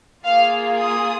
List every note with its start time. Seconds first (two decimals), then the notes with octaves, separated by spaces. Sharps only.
0.24 A#3 F4 G#4 F5
0.80 D#6